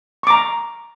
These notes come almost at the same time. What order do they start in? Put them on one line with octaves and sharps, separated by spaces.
C#6 D6 A#5